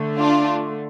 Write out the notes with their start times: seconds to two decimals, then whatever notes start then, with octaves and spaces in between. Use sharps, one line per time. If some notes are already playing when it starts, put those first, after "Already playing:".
Already playing: D3 A3
0.17 D4 F4